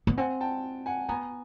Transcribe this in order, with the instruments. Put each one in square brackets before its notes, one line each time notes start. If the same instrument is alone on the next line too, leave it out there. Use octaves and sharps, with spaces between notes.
[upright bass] B3
[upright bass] C4 [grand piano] F#5 G#5
[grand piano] G5 A5
F#5 G#5
[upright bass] B3 [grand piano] G#5 A#5